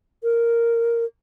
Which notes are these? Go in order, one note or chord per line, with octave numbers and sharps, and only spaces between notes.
A#4